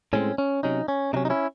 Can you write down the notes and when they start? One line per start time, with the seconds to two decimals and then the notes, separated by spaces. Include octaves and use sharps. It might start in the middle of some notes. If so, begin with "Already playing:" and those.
0.13 A2 G#3 C4 C#4
0.38 C#4
0.63 C3 F#3 C#4 D#4
0.88 C#4
1.13 C3 F#3 C#4 D#4
1.25 D#4
1.30 C#4 E4